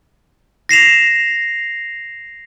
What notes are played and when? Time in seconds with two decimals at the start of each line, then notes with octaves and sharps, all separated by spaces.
0.69 A#6 C7 E7 F7